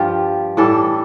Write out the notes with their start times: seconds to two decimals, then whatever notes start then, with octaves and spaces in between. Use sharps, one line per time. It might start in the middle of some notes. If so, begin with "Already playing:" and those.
Already playing: G2 F3 F4 G4
0.57 A2 E3 G3 A4